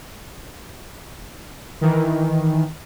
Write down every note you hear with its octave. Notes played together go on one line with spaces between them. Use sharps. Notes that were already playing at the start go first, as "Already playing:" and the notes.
D#3 E3